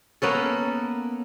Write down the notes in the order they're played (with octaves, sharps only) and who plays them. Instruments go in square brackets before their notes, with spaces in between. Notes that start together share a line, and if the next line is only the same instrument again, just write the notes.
[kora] A#3 B3 C#4 A4